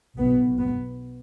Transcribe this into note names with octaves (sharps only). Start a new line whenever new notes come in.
B1 B2 B3
B3